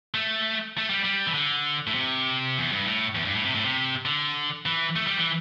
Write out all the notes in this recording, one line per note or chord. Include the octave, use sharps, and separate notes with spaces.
A3
A3
G3
G3
E3
D3
A2
C3
E2
G2
A2
E2
G2
A2
C3
A2
C3
D3
E3
A3
G3
E3